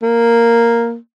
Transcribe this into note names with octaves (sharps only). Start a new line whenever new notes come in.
A#3